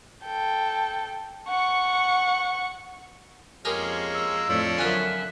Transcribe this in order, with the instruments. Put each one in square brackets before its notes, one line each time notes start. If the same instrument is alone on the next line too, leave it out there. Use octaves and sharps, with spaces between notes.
[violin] A4 G5
F#5 C#6
[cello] F2 [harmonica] G#3 A#3 C#4 [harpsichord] G4 G#4 A#4
[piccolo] E6
[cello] F2 A2 [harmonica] F3 D4 C#5
[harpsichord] F#2 F4 G#5 [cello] D3 E5 [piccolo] F#6